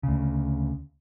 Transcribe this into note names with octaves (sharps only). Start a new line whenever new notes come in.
D2 C#3